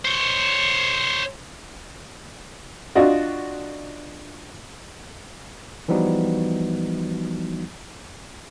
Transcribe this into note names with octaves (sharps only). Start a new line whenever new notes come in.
C5 C#5
D4 F4 F#4 D5 D#5
E3 F3 G3 B3 D#4 F#4